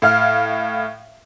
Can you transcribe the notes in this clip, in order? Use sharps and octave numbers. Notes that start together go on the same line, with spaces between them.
A2 F5 F6